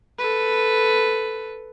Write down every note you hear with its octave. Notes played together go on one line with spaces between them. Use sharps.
A4 B4